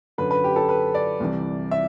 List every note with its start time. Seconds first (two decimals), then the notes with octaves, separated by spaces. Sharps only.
0.18 F#2 D3 B4
0.31 B4
0.44 G4
0.56 A4
0.69 B4
0.94 D5
1.20 C2 C3 E3
1.71 E5